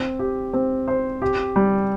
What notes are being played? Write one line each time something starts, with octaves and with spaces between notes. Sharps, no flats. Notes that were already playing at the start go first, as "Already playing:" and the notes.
Already playing: C4
G4
C4
C5
G4
G3